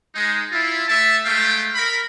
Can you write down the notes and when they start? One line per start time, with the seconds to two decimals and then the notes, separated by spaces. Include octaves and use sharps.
0.15 G#3 D#4
0.52 E4 F4
0.88 A3 E5 A5
1.25 G#3 A3 F5 G5
1.75 A#4 B5